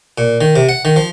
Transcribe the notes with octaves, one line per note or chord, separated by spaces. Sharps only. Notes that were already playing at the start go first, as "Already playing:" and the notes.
A#2
D#3
C3
F#5
D#3
F3